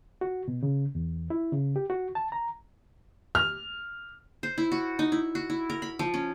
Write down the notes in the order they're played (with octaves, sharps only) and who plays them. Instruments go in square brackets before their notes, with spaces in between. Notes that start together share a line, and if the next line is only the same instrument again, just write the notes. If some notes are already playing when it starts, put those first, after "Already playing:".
[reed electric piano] F#4
B2
C#3
E2
E4
C#3
G4
F#4
A5
A#5
[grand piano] F6
[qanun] C5
E4
F#4
D#4
E4
F#4
E4
A#4
B5
F3
C#4